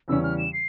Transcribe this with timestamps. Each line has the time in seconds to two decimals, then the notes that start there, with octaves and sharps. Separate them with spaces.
0.08 E2 C#3 E3 G3 C#4 E6
0.23 F6
0.38 E7
0.53 C7